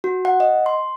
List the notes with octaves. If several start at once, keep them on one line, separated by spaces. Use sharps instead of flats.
F#4
F#5
D#5
C6